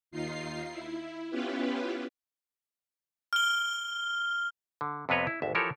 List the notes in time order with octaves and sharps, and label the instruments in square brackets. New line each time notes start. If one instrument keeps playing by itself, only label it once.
[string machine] D#2 D#4 F4 C7
E4
B3 C#4 E4 F4 G4 B4
[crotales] F6 G7
[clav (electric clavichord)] D3
F2 C3 B3 B4 C#5 D#5
E4
G#1 D2 E5
E3 F3 G4 A4 A#4 C#5